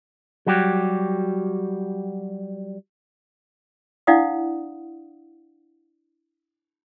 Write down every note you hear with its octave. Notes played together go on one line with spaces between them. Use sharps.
F#3 G3 F#4 G4
D4 E4 D5 F5 F#5 D#6